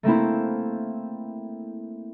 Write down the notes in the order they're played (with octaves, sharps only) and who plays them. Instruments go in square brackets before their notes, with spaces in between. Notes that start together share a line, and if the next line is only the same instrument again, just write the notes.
[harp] A3 A#3 C4 E4